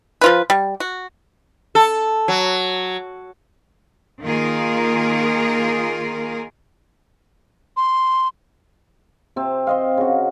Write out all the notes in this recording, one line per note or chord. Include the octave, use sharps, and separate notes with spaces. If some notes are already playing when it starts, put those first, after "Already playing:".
F3 F4 B4
G3
F#4
A4
F#3
D#3 A#3 F4 G#4 A#4
C6
C3 C4
C5 D#5 F5
C#3 F#4